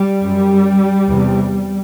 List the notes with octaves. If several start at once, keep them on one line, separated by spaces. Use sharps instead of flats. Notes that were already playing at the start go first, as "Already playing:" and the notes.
Already playing: G3
F#2
E2 C3